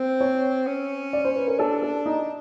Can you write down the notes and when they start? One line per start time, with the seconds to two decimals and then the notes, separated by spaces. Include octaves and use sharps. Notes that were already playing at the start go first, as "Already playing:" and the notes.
Already playing: C4
0.21 C#5
0.67 C#4
1.13 D5
1.25 C5
1.36 B4
1.47 A#4
1.59 D4 A4
1.82 A4
2.06 D#4